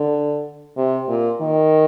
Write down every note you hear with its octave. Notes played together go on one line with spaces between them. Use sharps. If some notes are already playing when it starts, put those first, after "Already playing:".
Already playing: D3
C3
A#2
D#3